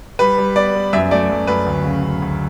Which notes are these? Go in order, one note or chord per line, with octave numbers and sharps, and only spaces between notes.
G3 B4
G3
B3 D5
B3
F#2 E5
A3 D5
F#2
F#2 B4
D2
C#3
C#3
D2